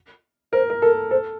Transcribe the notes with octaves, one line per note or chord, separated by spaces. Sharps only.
A#4 C5
A#4
A4 A#4
A4 C5